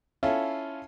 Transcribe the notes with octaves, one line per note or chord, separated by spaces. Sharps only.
C#4 E4 F4 A4